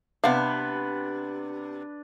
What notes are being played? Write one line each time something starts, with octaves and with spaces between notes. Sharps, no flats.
C3 B3 D4 B4 E5 F5